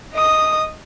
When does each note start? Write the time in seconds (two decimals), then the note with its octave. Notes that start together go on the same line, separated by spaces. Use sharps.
0.13 D#5 D#6